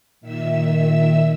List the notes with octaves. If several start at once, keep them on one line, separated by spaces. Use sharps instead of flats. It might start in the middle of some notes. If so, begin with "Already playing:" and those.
A#2 D#3 E5 E6